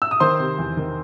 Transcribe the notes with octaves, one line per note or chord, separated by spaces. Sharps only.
E6
D#6
D#3 C5 C6
C3
E2
D#3